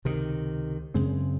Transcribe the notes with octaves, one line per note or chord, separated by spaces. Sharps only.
C#2 C3 D#3
F#2 C#3 G#3 C4